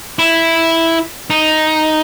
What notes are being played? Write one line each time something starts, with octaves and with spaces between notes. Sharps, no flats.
E4
D#4